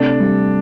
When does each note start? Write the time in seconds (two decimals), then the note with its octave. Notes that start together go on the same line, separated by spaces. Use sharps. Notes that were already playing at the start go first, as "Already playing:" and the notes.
Already playing: C3 A3 D4
0.20 G3